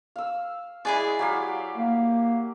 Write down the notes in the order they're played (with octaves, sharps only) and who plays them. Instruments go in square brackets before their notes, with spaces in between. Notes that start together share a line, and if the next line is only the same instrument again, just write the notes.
[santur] F5 E6
[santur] G#3 [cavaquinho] E4 G#4 D5
[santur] F#3 G4 F5
[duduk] A#3